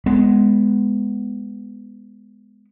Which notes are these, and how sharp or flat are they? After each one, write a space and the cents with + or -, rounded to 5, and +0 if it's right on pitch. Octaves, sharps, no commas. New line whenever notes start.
G#3 +0 B3 +10